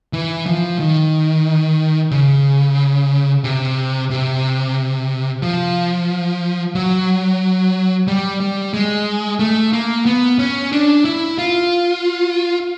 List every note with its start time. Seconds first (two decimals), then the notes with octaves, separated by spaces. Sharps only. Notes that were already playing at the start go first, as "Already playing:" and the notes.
0.13 E3
0.46 F3
0.80 D#3
2.11 C#3
3.44 C3
4.10 C3
5.42 F3
6.75 F#3
8.08 G3
8.40 G3
8.74 G#3
9.39 A3
9.73 A#3
10.06 B3
10.39 C#4
10.72 D4
11.05 E4
11.38 F4